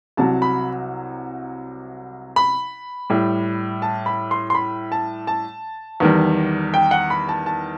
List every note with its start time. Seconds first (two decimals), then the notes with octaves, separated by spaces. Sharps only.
0.17 C2 C3 F#3 A5
0.42 B5
2.36 B5
3.10 A2 G3
3.82 A5
4.06 B5
4.31 C6
4.50 C6
4.55 B5
4.92 A5
5.27 A5
6.00 E2 D#3 G3
6.74 G5
6.91 F#5
7.10 B5
7.29 A5
7.46 A5